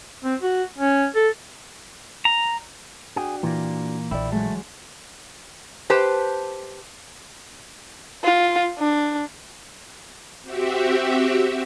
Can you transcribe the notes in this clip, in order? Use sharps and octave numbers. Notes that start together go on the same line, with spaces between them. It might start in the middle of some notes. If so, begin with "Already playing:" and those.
C4
F#4
C#4
A4
A#5
D4 F#4 G#4 G5
A#2 E3 A#3
A#1 E4 D5 D#5 G5
F#3 G#3 A3
G4 B4 C5 A5
F4
D4
C4 F#4 G4 E5